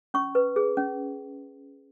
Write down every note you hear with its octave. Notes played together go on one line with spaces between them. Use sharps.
C#4 C#6
B4
G#4
C#4